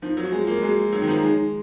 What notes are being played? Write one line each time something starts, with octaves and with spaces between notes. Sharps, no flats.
F3 D#4
F#3 F#4
G#3
F4
A#3
G#3 F#4
F#3 D#4
D#3
F3
F#3
G#3